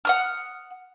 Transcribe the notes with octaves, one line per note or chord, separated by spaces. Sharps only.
F#5 D#6 F6